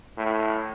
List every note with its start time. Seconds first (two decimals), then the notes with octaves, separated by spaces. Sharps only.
0.17 A2